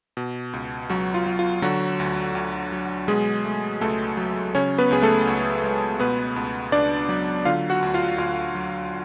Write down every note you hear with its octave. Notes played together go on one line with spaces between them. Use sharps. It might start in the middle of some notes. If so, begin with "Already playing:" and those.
B2
C#2
C#2 F#3 F#4
F4
F#3
F4
D3 F#3 F#4
D2
D2
F#3
B2 G#3 G#4
A3
C#2 A3 A4
F#3
C#3 C#4 C#5
B3 B4
C#2 G#4
A3 A4
C#2
G#3
B2 B3 B4
C#2
C#2 D4 D5
F#3
D3 F4 F5
F#4 F#5
D2
F4 F5
D2 F4 F5
F#3